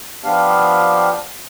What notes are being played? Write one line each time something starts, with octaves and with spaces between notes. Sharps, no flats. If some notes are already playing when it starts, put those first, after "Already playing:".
F3 B3 D4 G4 F5